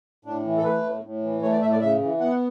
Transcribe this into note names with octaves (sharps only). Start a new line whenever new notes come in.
A2 D4
E3
A4
A3 B4
A2
A2
E3
A3 C#5
D5
A2 E5
D5
C#3 E5
E3
B3 F#5